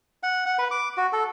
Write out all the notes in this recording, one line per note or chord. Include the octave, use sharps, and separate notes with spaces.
F#5
F#5
B4
D6
F#4
A4